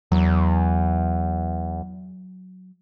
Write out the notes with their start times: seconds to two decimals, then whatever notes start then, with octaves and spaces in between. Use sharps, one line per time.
0.12 E2 F#3